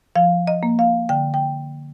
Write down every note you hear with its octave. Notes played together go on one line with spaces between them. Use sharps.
F3 F5
D#5
A#3
F5
D3 G5
G5